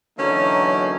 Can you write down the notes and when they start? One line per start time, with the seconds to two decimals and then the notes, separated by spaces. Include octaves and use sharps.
0.18 D3 E3 F#3 A#3 C#4 D#4